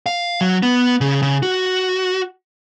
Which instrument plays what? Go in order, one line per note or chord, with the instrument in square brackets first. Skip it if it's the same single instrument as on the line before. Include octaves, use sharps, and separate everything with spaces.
[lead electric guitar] F5
F#3
B3
C#3
C#3
F#4